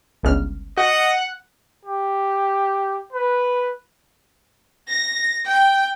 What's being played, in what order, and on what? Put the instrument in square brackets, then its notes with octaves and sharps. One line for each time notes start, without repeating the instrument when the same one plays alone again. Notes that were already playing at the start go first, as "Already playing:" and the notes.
[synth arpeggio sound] G1 C#2 F6
[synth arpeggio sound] F#4 [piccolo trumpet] D#5 [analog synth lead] F#5
[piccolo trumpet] G4
B4
[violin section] A#6
G5